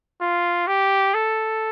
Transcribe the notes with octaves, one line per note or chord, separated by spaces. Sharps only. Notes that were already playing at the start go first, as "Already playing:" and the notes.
F4
G4
A4